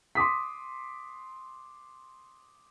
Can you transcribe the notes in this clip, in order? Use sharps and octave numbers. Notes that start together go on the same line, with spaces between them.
C6 D6 D#6 B6